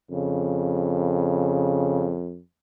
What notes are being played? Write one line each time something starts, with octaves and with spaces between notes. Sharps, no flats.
F2 C#3